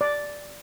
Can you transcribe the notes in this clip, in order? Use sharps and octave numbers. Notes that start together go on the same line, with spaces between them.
D5